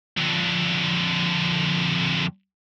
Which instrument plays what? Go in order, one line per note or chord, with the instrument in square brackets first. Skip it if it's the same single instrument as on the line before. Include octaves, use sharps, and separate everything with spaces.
[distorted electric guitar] F2 D3